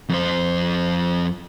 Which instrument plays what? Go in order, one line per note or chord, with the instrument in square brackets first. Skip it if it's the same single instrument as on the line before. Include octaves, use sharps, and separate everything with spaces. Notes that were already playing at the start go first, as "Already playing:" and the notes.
[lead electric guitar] F2 C5